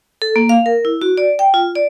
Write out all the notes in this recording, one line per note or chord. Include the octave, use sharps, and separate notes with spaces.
A4
A#3
F5
A#4
E4
F#4
D5
G5
F4
D5